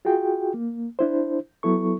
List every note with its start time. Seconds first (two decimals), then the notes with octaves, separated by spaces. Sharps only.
0.05 F4 F#4 G#4 G5
0.54 A#3
0.99 D4 E4 C5
1.63 F#3 B3 E4 A4 C#6